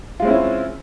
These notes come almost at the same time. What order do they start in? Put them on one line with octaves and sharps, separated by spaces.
F4 G#3 C4 E4 C#4